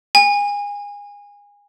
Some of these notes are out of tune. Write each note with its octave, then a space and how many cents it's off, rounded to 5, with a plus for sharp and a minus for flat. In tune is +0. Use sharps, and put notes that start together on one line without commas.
G#5 -25